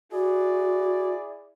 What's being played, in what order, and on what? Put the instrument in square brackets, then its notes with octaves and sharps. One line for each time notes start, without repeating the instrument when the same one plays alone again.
[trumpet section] E4 G#4 D5 [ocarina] F#4